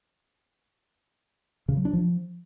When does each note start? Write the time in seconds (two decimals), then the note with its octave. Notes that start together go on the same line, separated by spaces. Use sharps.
1.68 C#3
1.77 F#3
1.85 D4
1.93 F3